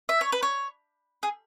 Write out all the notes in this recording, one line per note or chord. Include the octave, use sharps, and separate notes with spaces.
E5
C#5
B4
C#5
G#4